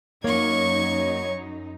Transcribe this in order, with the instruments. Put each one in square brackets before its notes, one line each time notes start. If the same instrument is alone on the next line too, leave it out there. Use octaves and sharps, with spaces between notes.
[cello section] F#2 D#4 [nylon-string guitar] A#3 [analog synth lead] C#5 [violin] C#6 G#6